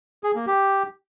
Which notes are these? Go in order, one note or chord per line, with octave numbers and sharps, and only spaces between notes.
G#4
A#3
G4